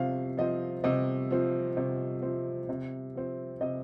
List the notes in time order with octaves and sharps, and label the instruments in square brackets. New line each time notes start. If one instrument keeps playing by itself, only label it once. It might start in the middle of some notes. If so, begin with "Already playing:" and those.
Already playing: [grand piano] C3 F3 C4 F5
F3 C4 D#5
C3 D#5
F3 C4
C3
F3 C4
C3
F3 C4
C3 D#5